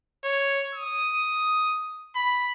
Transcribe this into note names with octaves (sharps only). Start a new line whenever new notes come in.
C#5
D#6
B5